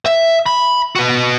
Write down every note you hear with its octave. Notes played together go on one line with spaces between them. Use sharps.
E5
B5
F#4 B4